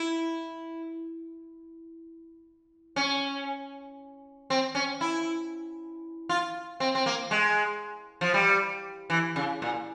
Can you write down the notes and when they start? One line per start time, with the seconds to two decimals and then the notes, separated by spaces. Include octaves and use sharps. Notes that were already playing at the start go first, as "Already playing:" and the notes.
Already playing: E4
2.96 C#4
4.50 C4
4.75 C#4
5.01 E4
6.29 F4
6.80 C4
6.95 C4
7.06 A#3
7.31 G#3
8.21 F3
8.34 G3
9.10 E3
9.36 C#3
9.62 A#2